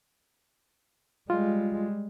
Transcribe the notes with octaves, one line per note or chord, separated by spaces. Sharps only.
G3 G#3 F4